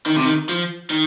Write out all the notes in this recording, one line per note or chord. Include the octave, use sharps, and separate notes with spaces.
D#3
C3
D#3
F3
D#3